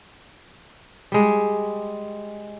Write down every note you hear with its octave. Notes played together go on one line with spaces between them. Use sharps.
G3 G#3